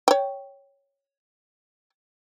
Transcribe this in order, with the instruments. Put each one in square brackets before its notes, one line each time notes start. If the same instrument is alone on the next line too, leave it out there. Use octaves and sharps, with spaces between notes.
[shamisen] C#5 G5